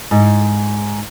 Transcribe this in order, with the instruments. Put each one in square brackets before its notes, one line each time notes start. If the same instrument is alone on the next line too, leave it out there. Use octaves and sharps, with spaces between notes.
[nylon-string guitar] G#2